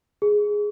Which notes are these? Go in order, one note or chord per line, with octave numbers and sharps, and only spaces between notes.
G#4